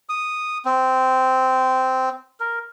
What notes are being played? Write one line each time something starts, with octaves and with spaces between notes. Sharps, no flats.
D#6
C4
A#4